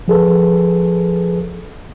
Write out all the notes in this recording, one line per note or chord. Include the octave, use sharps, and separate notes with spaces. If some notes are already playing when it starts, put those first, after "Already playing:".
F3 G#4 A4 B4